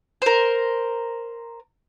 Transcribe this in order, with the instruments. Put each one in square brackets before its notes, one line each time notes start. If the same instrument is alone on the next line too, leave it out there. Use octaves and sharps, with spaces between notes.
[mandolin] A#4 C5